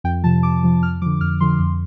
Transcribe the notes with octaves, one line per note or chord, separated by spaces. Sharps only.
F2 G5
C3 F3 A5
F2 D6
C3 F3
F2 F6
D3 F3 D6
F2 F6
D3 F3 C6
F2